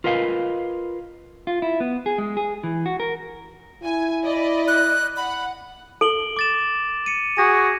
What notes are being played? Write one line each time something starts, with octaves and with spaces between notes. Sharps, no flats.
F4 A#4 B4 D#5 F5
F4
E4
B3
G#4
G#3
G#4
E3
F#4
A#4
E4 G#5
D5 D#5 B5
F#6
F#5 B5
A4 D7 F#7 G7
D6 A6 E7
C#7 D#7
F#4 G#4 A#6